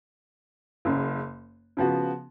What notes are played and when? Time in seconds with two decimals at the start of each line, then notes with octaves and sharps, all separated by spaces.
0.85 F#1 F#2 C#3
1.77 C#3 F3 B3 F#4